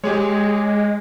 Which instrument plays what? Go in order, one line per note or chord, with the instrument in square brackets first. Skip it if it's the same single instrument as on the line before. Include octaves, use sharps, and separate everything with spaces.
[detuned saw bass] G#3 [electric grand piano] G4 G#4 C#5